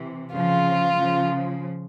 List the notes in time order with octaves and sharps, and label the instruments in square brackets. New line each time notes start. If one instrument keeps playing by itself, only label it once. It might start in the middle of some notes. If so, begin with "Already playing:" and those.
Already playing: [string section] C3 E3
[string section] C#3 F3 [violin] F4
[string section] C#3 F3